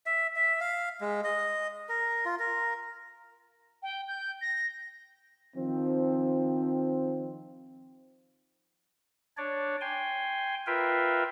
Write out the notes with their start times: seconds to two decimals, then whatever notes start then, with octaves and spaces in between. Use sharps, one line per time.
0.06 E5
0.36 E5
0.61 F5
1.01 G#3
1.24 D#5
1.89 A#4
2.25 F4
2.39 A#4
3.83 G5
4.08 G6
4.42 A#6
5.56 D#3 F3 C4
9.37 D4 C#5 D5
9.81 G5 G#5 C6
10.67 F4 A#4 B4 E5 F5 G5